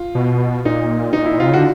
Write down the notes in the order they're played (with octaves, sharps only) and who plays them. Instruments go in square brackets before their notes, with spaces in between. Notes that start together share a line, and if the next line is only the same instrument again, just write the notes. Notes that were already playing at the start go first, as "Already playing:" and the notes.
Already playing: [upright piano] F4
[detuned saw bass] B2
[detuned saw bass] A#2 [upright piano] D#4
[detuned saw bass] A#2 [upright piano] D#4
[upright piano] E4
[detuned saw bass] C3 [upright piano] F4
[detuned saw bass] C#3
[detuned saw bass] D3 [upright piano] F#4